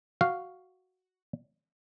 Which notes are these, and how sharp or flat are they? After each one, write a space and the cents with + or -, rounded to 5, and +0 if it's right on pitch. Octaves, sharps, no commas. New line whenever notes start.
F#4 +0 F5 +0